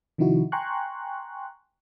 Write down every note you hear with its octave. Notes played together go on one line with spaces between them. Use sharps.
C3 D#3 F3 D#4 E4 F#4
G5 G#5 A#5 C6 C#6 F#6